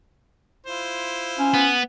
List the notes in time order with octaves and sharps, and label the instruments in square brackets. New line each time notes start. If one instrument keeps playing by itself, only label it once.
[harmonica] E4 F4 C5
[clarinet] C#4
[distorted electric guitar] B3